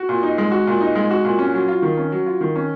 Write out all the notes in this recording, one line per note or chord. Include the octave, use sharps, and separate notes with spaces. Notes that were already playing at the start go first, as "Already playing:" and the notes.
Already playing: F#4
A#2
D#4
G#3
F#4
A#2
D#4
G#3
F#4
A#2
C#4
F#3
F4
D#3
C#4
F#3
F4
D#3
C#4